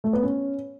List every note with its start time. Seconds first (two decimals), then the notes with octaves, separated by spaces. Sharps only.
0.04 A3
0.13 B3
0.23 C#4